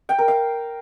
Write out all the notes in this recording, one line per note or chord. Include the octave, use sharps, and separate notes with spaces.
G5
A#4
F5